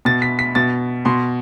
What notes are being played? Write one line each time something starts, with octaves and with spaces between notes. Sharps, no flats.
B2 A6
B6
B6
B2 A6
B2 C6